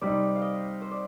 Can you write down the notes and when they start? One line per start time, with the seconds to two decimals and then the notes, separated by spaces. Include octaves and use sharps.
0.01 C3 G3 C4 D#4 D5
0.36 F5
0.42 D#5
0.82 C5
0.91 D5